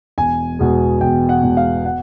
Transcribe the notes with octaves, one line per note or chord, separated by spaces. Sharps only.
E1 G#5
E2 B2 G#3
E1 G5
F#5
E2 B2 G#3
F5
F#5